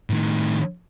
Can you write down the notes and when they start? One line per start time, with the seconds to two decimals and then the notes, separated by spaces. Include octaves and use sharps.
0.10 A2 D#3